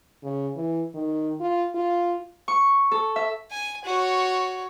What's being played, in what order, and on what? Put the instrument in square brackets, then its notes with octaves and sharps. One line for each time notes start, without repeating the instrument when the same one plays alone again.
[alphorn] C#3
E3
D#3
F4
F4
[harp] C#6
A4
E5
[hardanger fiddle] G#5
F#4 C#5